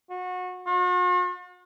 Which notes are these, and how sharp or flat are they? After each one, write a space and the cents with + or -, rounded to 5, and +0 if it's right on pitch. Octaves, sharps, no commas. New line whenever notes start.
F#4 -25
F#4 -45